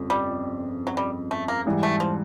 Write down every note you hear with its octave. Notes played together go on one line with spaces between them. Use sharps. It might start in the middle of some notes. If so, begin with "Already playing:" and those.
Already playing: G1 F2 C#3
G3
F#3
G3
A3
A#3
G#2 E3 G3
A3
F3